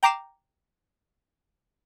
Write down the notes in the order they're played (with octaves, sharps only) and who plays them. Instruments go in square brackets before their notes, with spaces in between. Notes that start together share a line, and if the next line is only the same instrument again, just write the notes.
[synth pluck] G5 A#5 D6 C7 E7